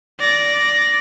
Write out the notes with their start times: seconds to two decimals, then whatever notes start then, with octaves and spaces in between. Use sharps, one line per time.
0.19 D5 A#6